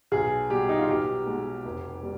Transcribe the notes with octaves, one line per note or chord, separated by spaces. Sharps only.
B1 G#4
B2 G3 G4
D#4
F4
B1 G4
B2 G#3
F1
G3